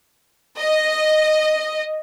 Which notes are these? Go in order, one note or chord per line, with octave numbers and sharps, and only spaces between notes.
D#5